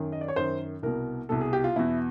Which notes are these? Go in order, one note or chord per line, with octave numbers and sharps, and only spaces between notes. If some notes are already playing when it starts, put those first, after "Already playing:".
Already playing: F#2 D#3
D#5
D5
C#5
F#2 D#3 C5
C2 B2 A#4
C2 B2 A4
G#4
G4
F4
E2 B2 E4